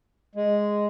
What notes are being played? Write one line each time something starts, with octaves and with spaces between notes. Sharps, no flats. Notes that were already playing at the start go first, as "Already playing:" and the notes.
G#3